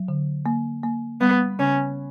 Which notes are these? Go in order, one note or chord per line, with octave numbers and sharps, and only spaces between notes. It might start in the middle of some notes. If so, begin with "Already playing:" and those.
Already playing: F#3
D3
A#3
A#3
G3 B3
C#3 C#4